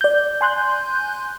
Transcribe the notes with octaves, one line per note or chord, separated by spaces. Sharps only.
D5 G6
G#5 C6 F#6 G6